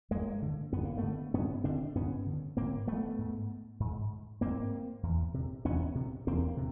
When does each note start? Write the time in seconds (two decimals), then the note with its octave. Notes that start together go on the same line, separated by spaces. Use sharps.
0.11 G2 G#3 A#3
0.42 D3
0.73 G2 B3
0.85 A#3
0.97 A3 B3
1.03 D3
1.34 G2 B3 C#4
1.64 D3 C4 D4
1.95 G2 B3 C#4
2.26 D3
2.57 G#2 A#3 C4
2.87 A3 B3
3.18 G#2
3.80 G#2
4.41 G#2 A#3 C4
5.03 E2
5.34 C3
5.65 E2 B3 C#4
5.95 C3
6.27 E2 A#3 C4
6.57 C3